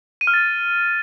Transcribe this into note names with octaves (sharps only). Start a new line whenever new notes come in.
D#7
F6
A6